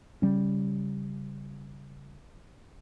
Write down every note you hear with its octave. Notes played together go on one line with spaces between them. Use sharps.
C#3 G3 C#4